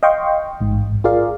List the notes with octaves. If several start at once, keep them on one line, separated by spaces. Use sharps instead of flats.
D#5 F5 G5 C6 C#6
A1 G#2
F4 G#4 A#4 D5 F5